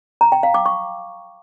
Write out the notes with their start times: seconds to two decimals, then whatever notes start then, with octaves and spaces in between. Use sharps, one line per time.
0.21 A#5
0.32 G5
0.43 F5
0.54 D6
0.66 C#6